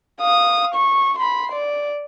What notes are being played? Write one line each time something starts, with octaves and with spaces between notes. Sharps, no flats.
F5 D#6
C#6
B5 C6
D5